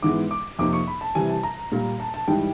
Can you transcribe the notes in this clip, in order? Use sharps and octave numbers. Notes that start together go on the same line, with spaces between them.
G#2 E3 G#3 B3 D6
D6
F2 C3 F3 A#3 D#4 D6
C#6
B5
A5
C3 E3 G3 G#5
A5
A#5
A#2 G3 A#3
A5
A5
G#2 E3 G3 G5